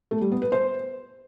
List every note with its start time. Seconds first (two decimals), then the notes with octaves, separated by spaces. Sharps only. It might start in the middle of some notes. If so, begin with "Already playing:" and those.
0.11 A3
0.21 G3
0.32 B3
0.42 B4
0.52 C5